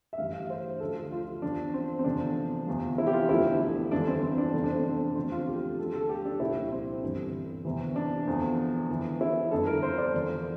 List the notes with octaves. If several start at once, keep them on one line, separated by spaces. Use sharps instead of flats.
E5
A1 G2 E3 F5
F5
C5
D2 D3 F3 A4
F4
F4
E2 D3 F3 D4
C4
C4
F1 E2 C3 F3 D4
E2 C3 F3
E4
G4
F4
E1 D2 D3 F3 E4
G1 F2 E3 D4
C4
C4
D4
F1 E2 D3 F3 C4
D4
C4
D4
C4
E1 D2 D3 F3 C4
F4
G4
D2 D3 F3 A4
A4
G4
D4
C2 A#2 F3 E4
C4
G1 G2 E3
E2 C3 E3
D4
E1 E2 D3 F3
E2 E3
E4
G1 F2 D3 A4
A#4
C5
D5
E1 E2 D3 F3